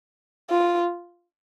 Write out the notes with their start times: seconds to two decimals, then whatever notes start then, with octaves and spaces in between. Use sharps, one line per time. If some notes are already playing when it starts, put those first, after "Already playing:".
0.50 F4